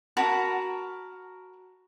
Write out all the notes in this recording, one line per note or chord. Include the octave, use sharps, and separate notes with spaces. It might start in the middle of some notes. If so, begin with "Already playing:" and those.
F#4 A#4 A5 B5